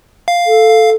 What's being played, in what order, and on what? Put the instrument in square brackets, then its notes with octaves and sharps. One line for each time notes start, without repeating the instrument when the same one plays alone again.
[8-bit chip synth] F5
[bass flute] A4
[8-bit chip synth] F5